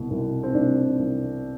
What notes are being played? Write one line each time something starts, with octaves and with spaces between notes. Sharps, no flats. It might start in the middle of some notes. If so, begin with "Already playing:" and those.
Already playing: C2 B2
C2
C4
C2 D4
C2